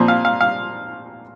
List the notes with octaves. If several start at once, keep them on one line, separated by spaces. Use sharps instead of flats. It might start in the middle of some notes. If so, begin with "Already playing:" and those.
Already playing: A#2 F3 C4
F5
F5
F5